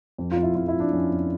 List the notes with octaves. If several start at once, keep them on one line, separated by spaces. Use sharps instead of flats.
F2
F4
F2
E4
F2 F4
E4
F3
D4
F2 C#4
F2